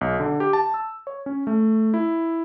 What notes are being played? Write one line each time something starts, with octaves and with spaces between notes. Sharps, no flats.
B1
D3
G4
A5
E6
C#5
C#4
A3
E4